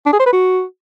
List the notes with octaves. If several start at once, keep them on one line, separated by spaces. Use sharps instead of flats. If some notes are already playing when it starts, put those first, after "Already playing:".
D4
G#4
C5
B4
F#4